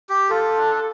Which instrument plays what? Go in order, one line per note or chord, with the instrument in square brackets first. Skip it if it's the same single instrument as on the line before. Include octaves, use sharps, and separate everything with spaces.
[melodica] G4
[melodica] F4 [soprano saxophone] A4
[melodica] D4